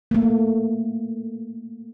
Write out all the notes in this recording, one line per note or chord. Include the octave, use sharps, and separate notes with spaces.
A3 A#3